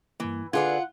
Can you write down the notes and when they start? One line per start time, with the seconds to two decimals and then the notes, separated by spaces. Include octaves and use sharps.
0.20 G2 E3 A#3
0.53 D3 F4 G#4 B4 D5 F#5 G#6